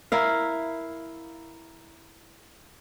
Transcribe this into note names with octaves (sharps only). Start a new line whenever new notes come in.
E4 A#4 F5